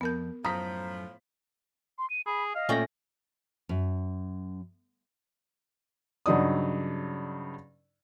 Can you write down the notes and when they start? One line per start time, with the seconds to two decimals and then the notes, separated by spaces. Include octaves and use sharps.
0.01 F2 B3 A#4 A5 G6
0.45 F#2 A2 F3 A#5 D#6 B6
1.98 C6
2.10 D#7
2.26 G#4 B5
2.55 D#5 F5
2.69 A#2 A3 C#4 D5 G5 A#6
3.69 F#2
6.26 G2 C#3 F#3 D#4 D5 D#6